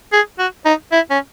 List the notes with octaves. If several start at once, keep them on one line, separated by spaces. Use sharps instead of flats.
G#4
F#4
D#4
E4
C#4